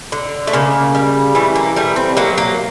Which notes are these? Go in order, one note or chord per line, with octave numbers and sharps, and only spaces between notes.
D3
A3
C#3 A#3
G3
E3 A3
A#3
G3 A3
C4
F#3 A#3
A#3